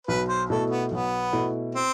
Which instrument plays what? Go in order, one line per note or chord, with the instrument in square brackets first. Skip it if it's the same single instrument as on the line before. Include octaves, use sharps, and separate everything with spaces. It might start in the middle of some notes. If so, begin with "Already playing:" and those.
[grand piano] B1 [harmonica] B4
[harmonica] C5
[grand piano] B2 A3 E4 [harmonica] A4
[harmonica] B3
[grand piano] B1 [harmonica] B3
[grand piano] B2 A3 E4
[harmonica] C4